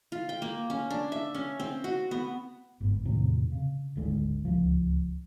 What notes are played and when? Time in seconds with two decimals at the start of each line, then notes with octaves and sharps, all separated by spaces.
0.12 F4
0.29 G5
0.42 A#3
0.70 C#4
0.90 D4
1.12 E5
1.35 C#4
1.60 C4
1.84 F#4
2.11 B3
2.80 G1 G#2 D3 B3
3.05 E2 A2 C3 D#3
3.52 C#3
3.95 D1 G#1 D3 G#3
4.45 D1 C#2 F3